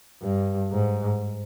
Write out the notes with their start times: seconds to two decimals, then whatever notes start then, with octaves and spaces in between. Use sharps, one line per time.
0.22 G2
0.71 G#2